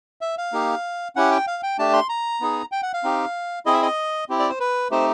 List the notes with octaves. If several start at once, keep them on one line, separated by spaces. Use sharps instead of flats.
E5
F5
A#3 D#4 G4
C#4 E4 G4 F#5
G5
F5
G5
A3 D4 G4 A5
C6
A#5
B3 D#4 G#4
G5
F#5
F5
C4 D#4 G4
C4 E4 G#4 D#5
E5
D#5
C4 E4 G4
D5
C5
B4
A3 C4 D#4 G4 C5